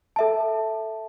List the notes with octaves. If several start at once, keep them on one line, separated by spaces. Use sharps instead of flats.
A4 E5 A5